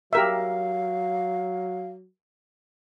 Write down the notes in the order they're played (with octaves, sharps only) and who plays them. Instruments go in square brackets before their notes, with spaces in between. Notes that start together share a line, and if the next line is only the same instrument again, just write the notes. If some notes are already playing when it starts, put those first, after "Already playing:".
[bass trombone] F#3 [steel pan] G4 A#4 E5 [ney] F5